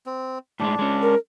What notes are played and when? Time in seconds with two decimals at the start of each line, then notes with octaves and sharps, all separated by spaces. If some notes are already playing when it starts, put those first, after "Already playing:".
0.06 C4
0.60 A2 G3 G#3 D4
0.79 G#3 C#4
1.02 A#4